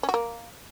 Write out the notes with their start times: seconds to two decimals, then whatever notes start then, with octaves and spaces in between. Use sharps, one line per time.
0.03 C#4
0.09 F#4
0.14 A#3